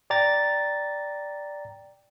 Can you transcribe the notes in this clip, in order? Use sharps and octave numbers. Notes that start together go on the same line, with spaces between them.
D5 G5 A#5 A6